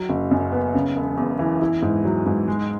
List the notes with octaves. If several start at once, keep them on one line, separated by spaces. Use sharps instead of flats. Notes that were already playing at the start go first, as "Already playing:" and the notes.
Already playing: F#3
F#1
F#2
B3
C#3
E1
E2
E3
E4
G#2
F#3
G#2
G#3